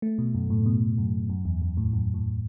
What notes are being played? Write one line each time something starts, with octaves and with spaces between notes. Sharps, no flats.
A3
B2
F#2
A2
B2
F#2
F#2
E2
F#2
A2
F#2
A2